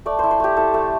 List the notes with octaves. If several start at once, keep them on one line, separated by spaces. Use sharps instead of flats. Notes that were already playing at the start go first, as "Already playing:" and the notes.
A3 D5
E4 C5
C5
A3 G4
E4 A4
A3